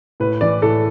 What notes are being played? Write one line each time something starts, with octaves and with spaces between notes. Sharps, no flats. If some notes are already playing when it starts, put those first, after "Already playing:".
A2 B4
E3 D5
A2 A4